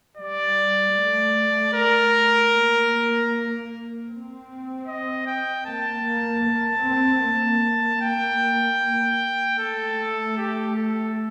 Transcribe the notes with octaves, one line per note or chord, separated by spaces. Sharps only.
G3 D5
A3
A#4
A#3
C4
D#5
G5
A#3 A5
A#3
A#3
C4
A#3
A#3
G5
A3 A4
G4
A4